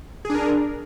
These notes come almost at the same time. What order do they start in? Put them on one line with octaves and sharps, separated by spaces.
G#4 D4 A#4